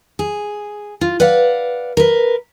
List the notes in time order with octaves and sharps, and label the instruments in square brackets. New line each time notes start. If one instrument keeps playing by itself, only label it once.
[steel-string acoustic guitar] G#4
F4
B4 D5 F5 F#5
A#4 B4